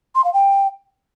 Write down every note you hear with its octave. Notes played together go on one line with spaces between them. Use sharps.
C6
F5
G5